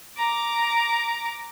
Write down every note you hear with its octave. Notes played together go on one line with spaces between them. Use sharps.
A#5 D6